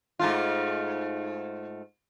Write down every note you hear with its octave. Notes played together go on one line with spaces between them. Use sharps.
G#2 A3 F4